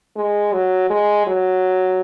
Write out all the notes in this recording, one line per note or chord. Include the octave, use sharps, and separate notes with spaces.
G#3
F#3
G#3
F#3